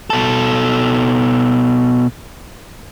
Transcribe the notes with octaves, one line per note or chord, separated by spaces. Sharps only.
B2 A4